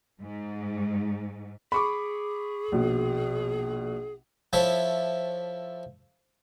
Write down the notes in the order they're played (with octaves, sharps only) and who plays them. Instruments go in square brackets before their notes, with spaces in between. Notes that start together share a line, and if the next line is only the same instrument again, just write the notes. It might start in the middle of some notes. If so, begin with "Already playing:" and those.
[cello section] G#2
[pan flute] G#4 [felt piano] B5 C#6 D6
[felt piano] A#1 B2
[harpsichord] F3 E4 A4 C#5 E5